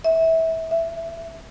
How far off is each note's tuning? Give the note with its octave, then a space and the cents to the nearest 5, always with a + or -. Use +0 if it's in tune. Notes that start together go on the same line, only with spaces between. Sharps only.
E5 -20
E5 +5